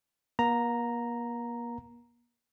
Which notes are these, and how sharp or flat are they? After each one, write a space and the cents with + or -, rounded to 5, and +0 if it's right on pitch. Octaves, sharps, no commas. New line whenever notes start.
A#3 +40 A#5 +0